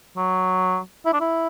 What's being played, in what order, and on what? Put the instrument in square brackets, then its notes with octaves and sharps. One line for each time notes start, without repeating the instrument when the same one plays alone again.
[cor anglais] F#3
E4
D4
E4